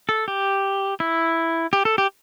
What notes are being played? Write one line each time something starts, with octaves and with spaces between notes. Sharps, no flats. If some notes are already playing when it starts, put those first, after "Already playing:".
A4
G4
E4
G4
A4
G4